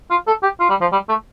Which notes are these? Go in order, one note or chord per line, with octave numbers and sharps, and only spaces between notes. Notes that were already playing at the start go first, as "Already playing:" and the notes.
F4
A4
G4
F4
G3
F3
G3
A3